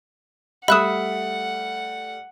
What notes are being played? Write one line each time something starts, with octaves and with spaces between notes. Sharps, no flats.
G3 A3 E5 F#5 B5 D#6 F#6 E7